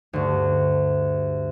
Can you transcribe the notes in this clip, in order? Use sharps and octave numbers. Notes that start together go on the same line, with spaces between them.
D2 G2